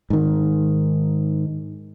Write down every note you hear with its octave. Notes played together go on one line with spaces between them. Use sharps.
G#2 D#3